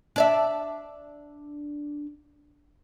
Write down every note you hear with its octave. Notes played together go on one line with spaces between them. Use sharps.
D4 D5 E5